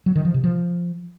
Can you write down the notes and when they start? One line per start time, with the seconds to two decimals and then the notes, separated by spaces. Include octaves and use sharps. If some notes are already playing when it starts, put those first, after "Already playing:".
0.06 F#3
0.16 D#3
0.25 F3
0.34 C3
0.44 F3